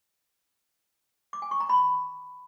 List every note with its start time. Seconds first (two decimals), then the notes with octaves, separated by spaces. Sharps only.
1.33 D6
1.42 G#5
1.51 C#6
1.60 A#5
1.69 B5